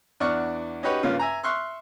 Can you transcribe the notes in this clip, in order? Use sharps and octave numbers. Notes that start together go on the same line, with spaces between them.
E2 D4 D5 F#5 C#6 F6
C#4 D#4 F#4 G4 B4 C#5
G2 C#3 A#3 C#4 F4
E5 G#5 A#5
E5 C6 C#6 F6 F#6